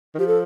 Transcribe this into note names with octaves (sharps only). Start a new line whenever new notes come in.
D#3
F3 G4
A4